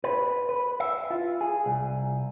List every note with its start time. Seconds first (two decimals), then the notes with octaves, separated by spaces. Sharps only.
0.04 B4
0.49 B4
0.80 E5
1.11 F4
1.41 G#4
1.66 C2